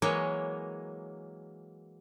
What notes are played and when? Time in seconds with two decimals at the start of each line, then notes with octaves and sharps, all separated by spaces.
0.02 E3 F#3 G#3 A#3 C#5